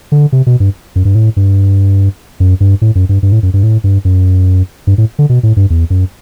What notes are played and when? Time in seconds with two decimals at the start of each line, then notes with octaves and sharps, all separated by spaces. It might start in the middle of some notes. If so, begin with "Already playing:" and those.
0.12 D3
0.32 C3
0.47 B2
0.60 G2
0.96 F#2
1.05 G2
1.15 A2
1.36 G2
2.40 F#2
2.60 G2
2.81 A2
2.95 F#2
3.09 G2
3.23 G2
3.32 A2
3.43 F#2
3.54 G2
3.63 A2
3.84 G2
4.05 F#2
4.87 G2
4.98 A2
5.19 D3
5.29 B2
5.43 A2
5.57 G2
5.70 E2
5.90 F#2